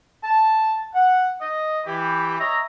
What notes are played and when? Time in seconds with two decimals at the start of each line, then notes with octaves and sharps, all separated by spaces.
0.23 A5
0.94 F#5
1.41 D#5
1.85 E3 G4
2.39 C#5 D#5 E5 A#5